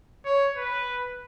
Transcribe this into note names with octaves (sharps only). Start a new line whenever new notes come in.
C#5
B4